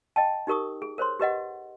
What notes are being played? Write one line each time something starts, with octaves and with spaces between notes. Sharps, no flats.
D#5 G5 A5
D#4 G4 A#4 C#6 D#6
G#4
A#4 C5 C#5 C6
G4 B4 D#5 F#5